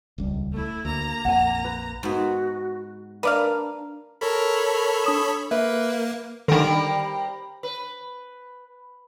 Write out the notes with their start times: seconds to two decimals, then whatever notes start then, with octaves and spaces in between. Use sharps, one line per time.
0.18 D#1 C#2 G3
0.52 A3 E4
0.85 D2 A#3 A#5
1.25 A#1 F2 F#5 G#5
1.64 B4
2.03 G#2 B3 F#4
3.23 A#3 D4 B4 D5 F5
4.21 A4 A#4 C#5 B5
5.04 D4 D#6 E7
5.51 A#3 B4 E5
6.48 D3 D#3 G3 C4 A#4
7.63 B4